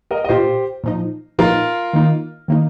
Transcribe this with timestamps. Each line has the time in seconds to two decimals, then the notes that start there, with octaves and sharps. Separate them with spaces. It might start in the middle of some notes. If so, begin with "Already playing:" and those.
0.11 A#4 D#5
0.24 D#5
0.29 A#2 A#3 F4 G4 C5
0.84 A#2 F3 D#4
1.38 A#2 F3 D#4 F4 A#4
1.93 D#3 A#3 D#4
2.48 D#3 A#3 D#4